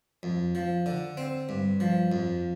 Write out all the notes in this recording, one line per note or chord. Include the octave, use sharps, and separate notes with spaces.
F2
F3
D3
C4
G2
F3
F2